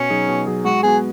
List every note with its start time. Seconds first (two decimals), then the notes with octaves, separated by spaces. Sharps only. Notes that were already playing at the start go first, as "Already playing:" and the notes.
Already playing: B2 C#4
0.10 F#3 D#4 G#4
0.29 B2
0.46 F#3 D#4 G#4
0.65 G#3 F#4
0.83 B3 F#4 G#4